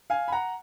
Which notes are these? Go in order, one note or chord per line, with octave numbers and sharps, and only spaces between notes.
F5 G#5
B5
F#5 A#5